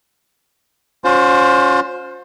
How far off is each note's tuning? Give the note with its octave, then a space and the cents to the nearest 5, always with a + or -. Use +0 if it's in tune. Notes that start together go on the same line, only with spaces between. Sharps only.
C#4 +15 F4 +40 C5 +0